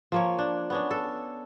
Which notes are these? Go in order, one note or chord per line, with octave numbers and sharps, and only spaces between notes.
F3 A#3 C#5
D4
B3 C#4 D4
A4